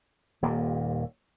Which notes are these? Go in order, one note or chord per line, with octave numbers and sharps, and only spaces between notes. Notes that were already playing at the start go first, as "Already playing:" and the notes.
D#1 D#2 A#3